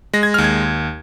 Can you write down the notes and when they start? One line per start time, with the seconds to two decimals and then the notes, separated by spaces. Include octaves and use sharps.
0.13 G#3 A#6
0.23 G#6
0.34 D#2 F6
0.44 G#6